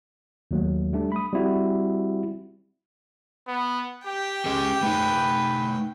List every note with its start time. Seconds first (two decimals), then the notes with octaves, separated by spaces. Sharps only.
0.51 D#2 F#3 A3
0.93 G3 A3 D4
1.12 B5 D#6
1.33 G3 C4 E4 F#4
3.48 B3
4.05 G4 G5
4.46 C#4 G4 G#4 D#5
4.83 A3 D#4 B4